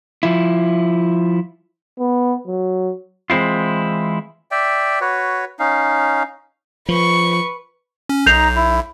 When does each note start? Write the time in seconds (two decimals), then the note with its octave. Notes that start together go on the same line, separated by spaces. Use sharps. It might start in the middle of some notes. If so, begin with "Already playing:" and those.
0.23 F3 E4
1.99 B3
2.47 F#3
3.30 E3 G#3 C4 E4 F4
4.51 D5 E5 G5
5.01 F#4 B4 C#5
5.59 C#4 D#4 F5
6.89 F3 B4 C#6
8.09 C#4
8.26 B1 D#4 A#5 G6 C7 F7
8.56 E4